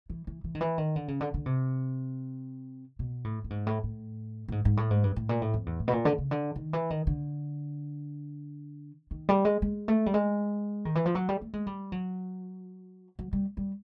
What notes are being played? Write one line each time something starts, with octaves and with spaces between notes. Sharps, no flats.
E3
E3
E3
D#3
E3
D#3
D3
C#3
D3
D3
C3
B2
A2
A2
G#2
A2
A2
A2
G#2
G#2
A2
G#2
G2
A2
A#2
A2
F2
E2
A2
B2
A#2
D3
C#3
D3
D#3
E3
D#3
D3
D#3
G3
G#3
G#3
A3
G3
G#3
D#3
E3
F3
F#3
G3
A3
G#3
G3
F#3
F#3
G3
G3